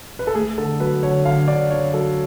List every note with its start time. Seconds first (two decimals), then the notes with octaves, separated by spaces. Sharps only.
0.19 B4
0.27 A4
0.35 A3 G#4
0.57 D3 A4
0.80 F#3 B4
1.03 D3 C#5
1.25 D3 F5
1.48 D3 D5
1.70 D3 C#5
1.93 F#3 A4